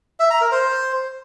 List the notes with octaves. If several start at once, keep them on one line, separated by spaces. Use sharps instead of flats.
E5
A#5
A#4
C5